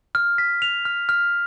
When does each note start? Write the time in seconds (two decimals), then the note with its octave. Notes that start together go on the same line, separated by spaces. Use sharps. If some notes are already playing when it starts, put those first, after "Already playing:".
0.15 F6
0.38 B6
0.62 F7
0.85 F6
1.09 F6